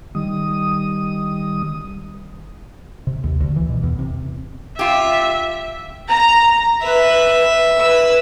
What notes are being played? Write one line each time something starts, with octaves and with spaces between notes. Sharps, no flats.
D#3 G3 D#6
C3
D#2
D2
E3
B2
E2
C3
F4 G4 E5
A#5
B4 E5
B4 E6